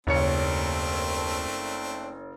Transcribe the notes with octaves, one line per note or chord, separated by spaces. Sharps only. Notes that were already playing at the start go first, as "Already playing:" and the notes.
F#1 D#2 A3 C4 D4 C#5 C#7